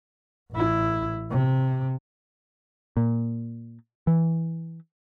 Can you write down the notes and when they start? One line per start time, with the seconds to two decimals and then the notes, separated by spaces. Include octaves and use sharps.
0.53 A1 E4
1.31 C3
2.97 A#2
4.07 E3